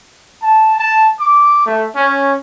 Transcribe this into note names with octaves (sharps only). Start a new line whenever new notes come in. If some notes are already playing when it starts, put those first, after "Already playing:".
A5
A5
D6
A3
C#4